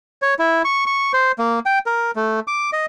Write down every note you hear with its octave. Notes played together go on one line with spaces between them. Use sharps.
C#5
E4
C#6
C#6
C5
A#3
G5
A#4
A3
D6
D#5